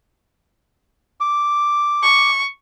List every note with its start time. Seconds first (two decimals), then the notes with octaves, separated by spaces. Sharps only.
1.20 D6
2.03 C#6